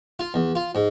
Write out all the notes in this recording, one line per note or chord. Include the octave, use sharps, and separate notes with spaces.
F4
E2
F4
G#2